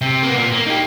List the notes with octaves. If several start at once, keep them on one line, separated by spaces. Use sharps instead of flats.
C3
A#3 B3
A#2
A#3
D#4 G4